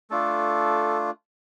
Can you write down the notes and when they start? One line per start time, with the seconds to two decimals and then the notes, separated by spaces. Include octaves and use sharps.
0.10 A3 D4 F4 A4